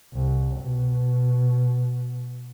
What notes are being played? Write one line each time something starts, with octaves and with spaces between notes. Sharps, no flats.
C2
B2